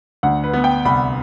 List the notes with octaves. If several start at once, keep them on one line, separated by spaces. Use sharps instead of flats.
D2 F#5
B4
B3
G5
C2 B5